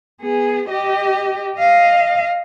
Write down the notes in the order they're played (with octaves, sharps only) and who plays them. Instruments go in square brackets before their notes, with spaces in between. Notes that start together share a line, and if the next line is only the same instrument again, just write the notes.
[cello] B3 G#4
G4 D#5
D#5 F5